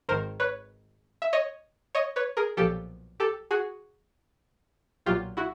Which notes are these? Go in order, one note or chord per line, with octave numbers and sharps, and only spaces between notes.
G#1 G#2 D#3 A#4 C5
B4 C#5
E5
C#5 D#5
C#5 D#5
B4 C#5
G#4 A#4
B1 A#2 F3 G4 A4
G4 A4
F#4 G#4
B1 A#2 F#3 F4 G4
E4 F#4